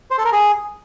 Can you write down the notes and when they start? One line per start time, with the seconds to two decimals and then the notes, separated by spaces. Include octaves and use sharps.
0.10 C5
0.18 A4
0.25 A#4
0.33 G#4